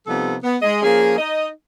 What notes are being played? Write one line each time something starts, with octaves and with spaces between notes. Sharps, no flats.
C3 F3 G3 B3 D#4 A4
B3
G#3 G#4 D#5
F3 A#3 C#4 G#4
D#4 D#5